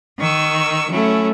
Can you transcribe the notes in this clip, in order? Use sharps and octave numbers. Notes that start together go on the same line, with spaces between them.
D#3 C#6 E6
F#3 A3 C#4 E4